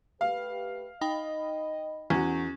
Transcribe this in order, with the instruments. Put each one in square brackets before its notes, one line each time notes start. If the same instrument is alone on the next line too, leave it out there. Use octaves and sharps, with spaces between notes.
[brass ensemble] A3 G4 B4 [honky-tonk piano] F5
[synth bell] D#4 G5 B5 [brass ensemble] D#5
[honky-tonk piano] E2 F#4 [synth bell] C#4